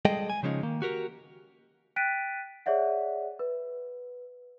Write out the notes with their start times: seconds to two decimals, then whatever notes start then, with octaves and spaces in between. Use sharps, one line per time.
0.05 G3 G#3 G#4 A4 D#5 G5
0.30 G#5
0.43 C#3 F3 G#3 C#4 D#4
0.63 D#3 A#3
0.82 F#4 G4 A#4
1.96 G5 F#6 A6 B6 D7 D#7
2.66 G#4 C#5 D5 E5 F#5
3.39 B4